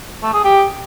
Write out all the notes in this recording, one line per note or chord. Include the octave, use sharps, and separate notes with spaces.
A3
G#4
G4